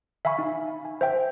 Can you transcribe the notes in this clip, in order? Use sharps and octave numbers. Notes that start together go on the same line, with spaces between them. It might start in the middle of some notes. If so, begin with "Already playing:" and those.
E5 F5 G#5 B5 C#6
D#4
G#5
C5 E5 G5